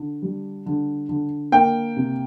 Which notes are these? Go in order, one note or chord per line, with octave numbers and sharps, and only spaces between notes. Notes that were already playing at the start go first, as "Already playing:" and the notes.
Already playing: D3
G3
D3
D3
A#3 G5
C3